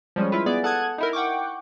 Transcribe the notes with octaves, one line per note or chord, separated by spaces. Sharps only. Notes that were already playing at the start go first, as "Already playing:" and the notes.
F3 G3 G#3 C#4
E4 F4 B4
B3 G#4 D5
A4 F#5 A5 D#6 F#6 G#6
D#4 E4 A#4
F#5 G5 C#6 D6